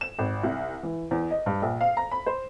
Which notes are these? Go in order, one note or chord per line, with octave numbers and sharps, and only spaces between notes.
E7
G#1
C2
E3
E2
D#5
G2
A#1
F5
A#5
B5
C5